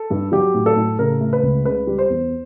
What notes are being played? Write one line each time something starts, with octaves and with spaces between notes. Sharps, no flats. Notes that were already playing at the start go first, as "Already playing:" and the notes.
Already playing: A4
G2
F#3 G4
A2
A4
A2
C#3 A#4
A3
B4
C#2
C#3 B4
G3
C5
E2